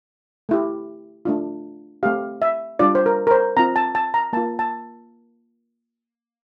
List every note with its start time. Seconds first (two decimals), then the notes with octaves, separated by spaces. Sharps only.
0.49 A3 E4 G4
1.25 A3 D4 F4
2.03 A3 C4 G4 F5
2.42 E5
2.79 G3 D4 F4 D5
2.95 C5
3.06 A#4
3.27 A#4
3.31 C5
3.57 C4 F4 A#5
3.76 A5
3.95 A5
4.14 A#5
4.33 A#3 F4 A5
4.59 A5